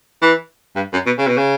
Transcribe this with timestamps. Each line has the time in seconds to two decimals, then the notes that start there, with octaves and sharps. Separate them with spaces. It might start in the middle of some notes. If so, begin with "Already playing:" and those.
0.22 E3
0.76 G2
0.93 F#2
1.06 B2
1.18 C#3
1.27 B2
1.37 C#3